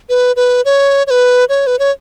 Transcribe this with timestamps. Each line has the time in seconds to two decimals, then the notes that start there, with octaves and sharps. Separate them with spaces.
0.09 B4
0.36 B4
0.65 C#5
1.07 C#5
1.10 B4
1.49 C#5
1.67 B4
1.79 C#5